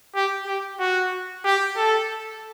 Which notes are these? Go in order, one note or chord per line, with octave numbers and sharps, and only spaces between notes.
G4
G4
F#4
G4
A4